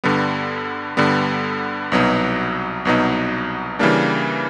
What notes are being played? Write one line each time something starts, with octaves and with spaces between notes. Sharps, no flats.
G2 D3 G3 B3
G2 D3 G3 B3
C2 B2 F#3 B3 D#4
C2 B2 F#3 B3 D#4
C#3 E3 G3 A#3 D4